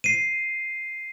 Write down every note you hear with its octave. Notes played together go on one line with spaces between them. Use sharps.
C7 D#7